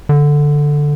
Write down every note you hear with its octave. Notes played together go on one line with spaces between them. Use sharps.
D3